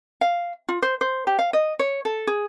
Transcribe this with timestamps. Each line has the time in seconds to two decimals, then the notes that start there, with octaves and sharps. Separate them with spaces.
0.21 F5
0.69 F4
0.82 C5
1.01 C5
1.27 G4
1.39 F5
1.53 D#5
1.79 C#5
2.05 A4
2.27 G#4